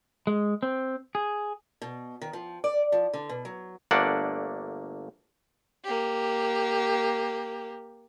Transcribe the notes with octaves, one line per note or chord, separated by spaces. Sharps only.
G#3
C4
G#4
B2
D#3
F3
D5
F3
D3
B2
F#3
G1 A3 A#3 D4 D5 F#5
A#3 G4